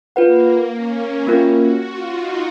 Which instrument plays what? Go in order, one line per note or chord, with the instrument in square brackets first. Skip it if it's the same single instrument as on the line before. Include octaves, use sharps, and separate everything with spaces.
[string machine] A#3 [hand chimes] F4 B4 F#5
[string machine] C#4
[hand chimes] A#3 C#4 F4 A#4 [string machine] F#4
[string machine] F#4
F4
D#4